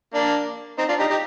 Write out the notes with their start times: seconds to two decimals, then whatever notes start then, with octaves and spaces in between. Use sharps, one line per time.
0.14 A#3 D4
0.78 C4 D#4
0.89 D4 F4
0.99 D#4 G4
1.10 D#4 G4